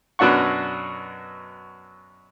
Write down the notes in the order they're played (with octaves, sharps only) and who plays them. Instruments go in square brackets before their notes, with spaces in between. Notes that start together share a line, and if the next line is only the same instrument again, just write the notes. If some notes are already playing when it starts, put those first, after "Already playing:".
[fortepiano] F#2 B2 F#3 D4 F#5 C#6